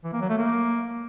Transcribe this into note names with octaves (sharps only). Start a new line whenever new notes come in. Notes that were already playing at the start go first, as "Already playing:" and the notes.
E3
A#3
F#3
A3
A#3